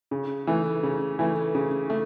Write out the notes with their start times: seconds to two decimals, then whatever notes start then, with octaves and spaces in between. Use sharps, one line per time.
0.11 C#3
0.47 E3 A3
0.83 C#3
1.19 E3 A3
1.55 C#3
1.90 A3